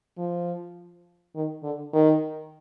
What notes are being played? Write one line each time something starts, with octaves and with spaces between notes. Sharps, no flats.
F3
D#3
D3
D#3